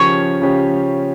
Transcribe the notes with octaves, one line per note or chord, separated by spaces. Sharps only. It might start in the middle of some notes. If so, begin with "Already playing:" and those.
Already playing: C#3 F3 C#4 G4 C#5
C#3 F3 C#4 G4